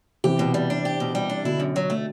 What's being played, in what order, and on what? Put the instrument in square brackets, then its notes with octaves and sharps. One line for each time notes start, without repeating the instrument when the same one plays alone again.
[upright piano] C3 E3 [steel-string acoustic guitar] G4
[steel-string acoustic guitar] B2
G3
D4
G4
B2
G3
D4
[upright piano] B2 D3 [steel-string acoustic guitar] E4
[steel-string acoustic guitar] F#2
F#3
A3